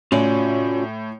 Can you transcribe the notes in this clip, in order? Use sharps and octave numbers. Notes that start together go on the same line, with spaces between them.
A2 C#4 F4 F#4 D5